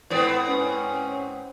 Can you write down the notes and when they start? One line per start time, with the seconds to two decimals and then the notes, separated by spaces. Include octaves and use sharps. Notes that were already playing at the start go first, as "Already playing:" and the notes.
0.10 G#2 B3 C4
0.48 C#4